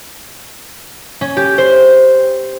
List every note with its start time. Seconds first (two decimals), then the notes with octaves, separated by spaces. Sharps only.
1.21 C#4
1.37 G4
1.58 C5